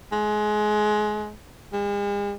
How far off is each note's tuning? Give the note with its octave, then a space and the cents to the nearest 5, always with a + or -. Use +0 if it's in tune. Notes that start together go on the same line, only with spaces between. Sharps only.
G#3 +25
G#3 -45